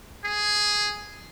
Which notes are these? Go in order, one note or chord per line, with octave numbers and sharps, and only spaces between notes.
G#4